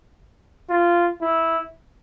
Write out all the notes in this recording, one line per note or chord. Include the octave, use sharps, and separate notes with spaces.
F4
E4